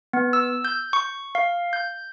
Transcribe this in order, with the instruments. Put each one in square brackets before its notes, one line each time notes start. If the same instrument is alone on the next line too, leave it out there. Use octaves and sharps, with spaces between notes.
[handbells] B3
E6
G6
C#6
F5
G6